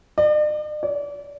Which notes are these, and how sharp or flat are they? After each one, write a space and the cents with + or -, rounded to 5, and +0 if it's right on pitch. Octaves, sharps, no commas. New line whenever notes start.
D5 +45
D5 -30